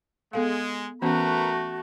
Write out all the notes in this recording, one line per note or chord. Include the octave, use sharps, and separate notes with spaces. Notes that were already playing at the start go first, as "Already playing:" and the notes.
G#3 B3 A4 F5
E3 A3 B3 C#4 F#4 A#4 B4 A#5